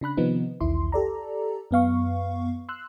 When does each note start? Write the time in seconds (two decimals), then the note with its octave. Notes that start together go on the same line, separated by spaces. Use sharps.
0.01 C#3 D4 B5 F#6
0.17 C3 D#3 F3 B3 D#4
0.60 B1 E2 D#3 E4 C6
0.92 G4 A4 D5 A#5
1.71 F#2 B3 F5 C#6
2.69 C6 E6 F#6